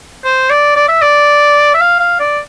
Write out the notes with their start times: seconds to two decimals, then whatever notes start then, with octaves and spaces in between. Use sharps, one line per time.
0.24 C5
0.50 D5
0.76 D5
0.89 E5
1.02 D5
1.74 E5
1.81 F5
2.00 F5
2.20 D5